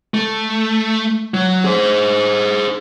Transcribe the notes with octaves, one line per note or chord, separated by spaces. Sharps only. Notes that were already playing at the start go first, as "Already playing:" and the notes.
A3
F#3
G#4 C5